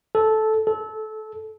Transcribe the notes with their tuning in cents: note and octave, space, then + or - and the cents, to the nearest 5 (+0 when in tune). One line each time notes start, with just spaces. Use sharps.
A4 -10
A4 -20